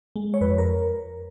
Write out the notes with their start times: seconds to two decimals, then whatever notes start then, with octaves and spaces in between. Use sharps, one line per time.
0.16 G#3
0.34 C#5
0.41 F2 B4
0.58 A#4